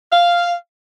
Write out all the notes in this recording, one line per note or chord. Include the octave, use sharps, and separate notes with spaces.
F5